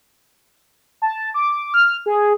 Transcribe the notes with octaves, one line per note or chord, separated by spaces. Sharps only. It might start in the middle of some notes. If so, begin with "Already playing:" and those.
A5
D6
F6
G#4